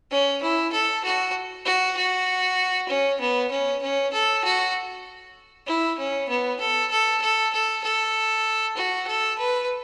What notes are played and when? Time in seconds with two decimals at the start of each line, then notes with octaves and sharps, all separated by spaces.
0.11 C#4
0.42 E4
0.73 A4
1.04 F#4
1.66 F#4
1.97 F#4
2.89 C#4
3.21 B3
3.51 C#4
3.82 C#4
4.13 A4
4.45 F#4
5.67 E4
5.98 C#4
6.29 B3
6.60 A4
6.91 A4
7.22 A4
7.53 A4
7.84 A4
8.77 F#4
9.07 A4
9.38 B4